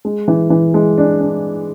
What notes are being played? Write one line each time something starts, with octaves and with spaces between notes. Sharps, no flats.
G#3
E3
E3
G#3
D4
D4